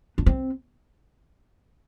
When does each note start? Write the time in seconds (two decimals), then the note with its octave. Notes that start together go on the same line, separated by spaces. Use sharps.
0.18 D4
0.26 C4